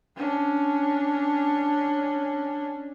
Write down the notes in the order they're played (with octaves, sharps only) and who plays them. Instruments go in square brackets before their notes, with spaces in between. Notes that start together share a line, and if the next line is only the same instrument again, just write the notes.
[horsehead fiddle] C#4 D4